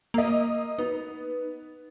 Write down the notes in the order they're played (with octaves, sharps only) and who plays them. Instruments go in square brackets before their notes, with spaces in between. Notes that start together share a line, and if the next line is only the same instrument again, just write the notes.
[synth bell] A#3 [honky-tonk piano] A#4 D#5
[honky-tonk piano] B3 [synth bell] D#4